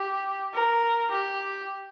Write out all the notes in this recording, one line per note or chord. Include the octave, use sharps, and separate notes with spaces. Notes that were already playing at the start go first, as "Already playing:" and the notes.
Already playing: G4
A#4
G4